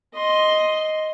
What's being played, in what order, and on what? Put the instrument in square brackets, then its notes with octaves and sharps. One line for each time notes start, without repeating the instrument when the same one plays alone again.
[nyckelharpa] D#5 C6